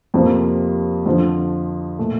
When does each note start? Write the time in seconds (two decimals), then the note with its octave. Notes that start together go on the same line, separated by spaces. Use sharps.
0.14 F2 C3 F3 A#3
1.06 F2 D3 F3
1.99 A#2 A3